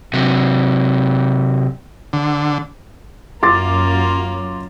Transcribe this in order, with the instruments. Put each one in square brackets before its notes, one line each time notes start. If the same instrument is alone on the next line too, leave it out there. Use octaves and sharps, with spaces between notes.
[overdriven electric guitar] C3 F#3
[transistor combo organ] D3
[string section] F#2 [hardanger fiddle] A#3 F4 [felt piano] C6 D6 A6